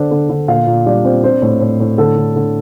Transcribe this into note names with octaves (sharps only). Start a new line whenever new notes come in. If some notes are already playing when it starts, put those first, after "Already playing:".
Already playing: D3 D4 C5
D3
D3
A#2 F4 F5
A#2
G3 D4 D5
A#2 C4 C5
C4 D4 C5
A2
A2
A2
D3 A4
D3
D3